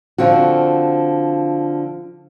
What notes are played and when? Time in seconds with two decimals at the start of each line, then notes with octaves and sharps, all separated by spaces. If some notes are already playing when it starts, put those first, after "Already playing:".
0.18 D3 F3 C4 F#4